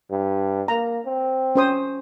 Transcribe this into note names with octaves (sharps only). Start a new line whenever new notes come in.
G2
A#3 A#5
C4
C#4 C5 D#6